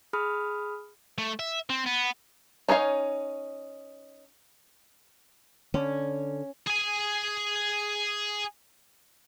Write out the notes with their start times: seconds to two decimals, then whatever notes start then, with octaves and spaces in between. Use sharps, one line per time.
0.13 G#4 B5 D#6 F6
1.18 A3
1.40 E5
1.70 C4
1.86 B3
2.69 C#4 D#4 C#5 F5
5.74 D3 C#4
6.67 G#4 G#5